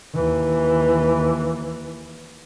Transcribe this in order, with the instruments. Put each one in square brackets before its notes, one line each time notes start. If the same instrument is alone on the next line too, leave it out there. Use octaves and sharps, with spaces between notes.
[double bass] D#2 E3